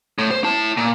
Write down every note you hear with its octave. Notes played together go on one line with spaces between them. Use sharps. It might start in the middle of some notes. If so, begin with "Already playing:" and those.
A2
C5
E4 A5
A#2